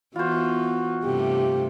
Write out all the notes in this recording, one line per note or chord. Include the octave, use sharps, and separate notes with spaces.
E3 B3 F4 F#4 C5
G2 C3 A3 G4